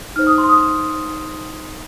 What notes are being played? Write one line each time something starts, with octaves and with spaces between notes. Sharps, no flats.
D#4 C5 F6
D#6
C6
D#6